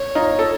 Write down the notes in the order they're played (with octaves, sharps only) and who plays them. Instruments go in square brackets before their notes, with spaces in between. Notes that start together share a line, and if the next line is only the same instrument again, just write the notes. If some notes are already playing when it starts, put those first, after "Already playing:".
Already playing: [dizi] C#5
[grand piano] D#4 F4
A4